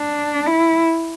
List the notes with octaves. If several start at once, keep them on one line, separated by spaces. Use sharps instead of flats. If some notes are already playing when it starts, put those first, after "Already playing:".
Already playing: D4
E4